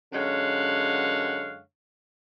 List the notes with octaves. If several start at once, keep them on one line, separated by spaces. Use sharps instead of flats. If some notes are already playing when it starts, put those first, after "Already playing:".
F#2 D3 G#3 C#5 F5 F#5